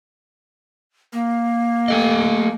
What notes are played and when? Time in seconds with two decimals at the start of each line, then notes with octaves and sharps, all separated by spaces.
1.13 A#3
1.88 A3 A4 D#5